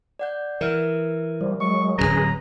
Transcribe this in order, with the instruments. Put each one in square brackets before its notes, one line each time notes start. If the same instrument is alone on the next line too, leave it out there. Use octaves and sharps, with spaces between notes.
[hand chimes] D5 F#5 G6
[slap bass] E3 [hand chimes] A#4 E5 F6
[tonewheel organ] F3 G3
[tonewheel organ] F#3 G#3 [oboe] C#6
[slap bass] D1 C#2 F#3 [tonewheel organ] C#4 G#4 B4 [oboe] A#5